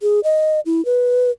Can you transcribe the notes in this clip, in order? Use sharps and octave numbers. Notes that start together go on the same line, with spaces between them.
G#4
D#5
E4
B4